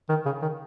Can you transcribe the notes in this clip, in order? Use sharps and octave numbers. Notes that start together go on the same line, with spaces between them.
D#3
C#3
D#3